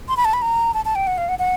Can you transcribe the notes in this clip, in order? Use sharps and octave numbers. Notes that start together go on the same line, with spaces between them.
C6
B5
A5
B5
A#5
A5
A5
G5
F#5
F5
F#5
F#5